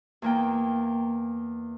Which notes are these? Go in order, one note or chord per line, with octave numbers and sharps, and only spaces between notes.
E2 A#3 G5